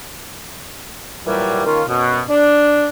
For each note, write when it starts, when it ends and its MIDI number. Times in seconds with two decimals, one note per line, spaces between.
1.26 1.62 46
1.26 1.62 52
1.26 1.62 54
1.26 1.62 55
1.65 1.82 51
1.65 1.82 58
1.65 1.82 61
1.65 1.82 65
1.88 2.22 42
1.88 2.22 47
2.29 2.88 62